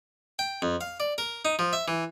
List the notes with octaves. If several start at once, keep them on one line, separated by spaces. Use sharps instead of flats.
G5
F2
F5
D5
A#4
D#4
F3
E5
E3